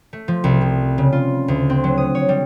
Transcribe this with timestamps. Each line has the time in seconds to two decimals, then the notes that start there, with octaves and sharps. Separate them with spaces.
0.13 A3
0.28 F3
0.44 C2
0.61 F3
0.98 C#3
1.13 F4
1.48 D2
1.70 C4
1.84 F#3
1.98 D#6
2.15 C#5
2.29 G3